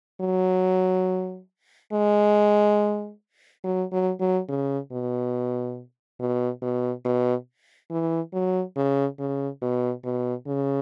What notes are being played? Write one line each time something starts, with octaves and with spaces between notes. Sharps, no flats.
F#3
G#3
F#3
F#3
F#3
C#3
B2
B2
B2
B2
E3
F#3
C#3
C#3
B2
B2
C#3